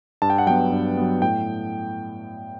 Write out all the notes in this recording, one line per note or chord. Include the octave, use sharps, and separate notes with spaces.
G2 A5
G5
F#5
F#3 B3 G5
G2
F#3 B3
A2 G5